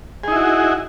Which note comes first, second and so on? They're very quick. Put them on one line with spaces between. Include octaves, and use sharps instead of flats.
G#4 D#4 E4 F#4